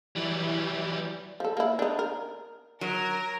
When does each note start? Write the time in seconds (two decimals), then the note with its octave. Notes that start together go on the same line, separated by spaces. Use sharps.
0.16 E3 F#3 G3
1.40 F3 A4
1.57 A#3 E4
1.79 D4 D#4
1.99 A#4
2.81 F#3 A#4